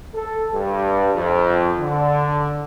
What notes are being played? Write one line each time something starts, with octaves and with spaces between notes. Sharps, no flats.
A4
G2
F2
D3